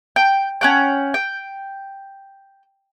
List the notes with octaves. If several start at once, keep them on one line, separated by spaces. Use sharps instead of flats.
G5
C#4 F#5 G5
G5